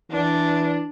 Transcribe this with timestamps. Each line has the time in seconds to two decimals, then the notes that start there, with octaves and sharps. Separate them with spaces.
0.11 E3 D4